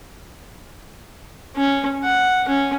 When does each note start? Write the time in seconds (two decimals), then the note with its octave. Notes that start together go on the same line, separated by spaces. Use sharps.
1.56 C#4
2.03 F#5
2.48 C#4